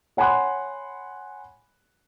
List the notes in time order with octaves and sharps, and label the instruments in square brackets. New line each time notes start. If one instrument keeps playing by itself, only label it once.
[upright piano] C#5 F#5 G#5 B5 C6 F#6